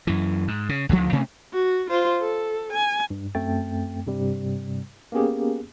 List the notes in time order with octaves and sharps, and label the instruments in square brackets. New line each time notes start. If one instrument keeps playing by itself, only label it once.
[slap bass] F#2 E3
G#2
C#3
D2 D3 D#3 F3
C3 A3 C4 C#4
[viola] F#4
F4 C5
A4
G#5
[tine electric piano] G2
F#2 A3 C4 G5 A6
G2 C3 G3
A#3 B3 C#4 G4 G#4